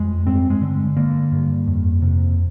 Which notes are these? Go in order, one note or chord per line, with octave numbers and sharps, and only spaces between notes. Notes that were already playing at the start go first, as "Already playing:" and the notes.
Already playing: F2 G#3
G2 C4
G#3
D3
D3 A#3
G2
F2
C3